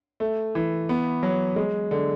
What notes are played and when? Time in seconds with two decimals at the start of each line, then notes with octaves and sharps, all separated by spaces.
0.20 A3
0.55 E3
0.89 B3
1.23 F#3
1.56 G#3
1.91 D3